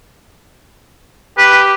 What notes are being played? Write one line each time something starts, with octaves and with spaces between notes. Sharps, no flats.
G4 B4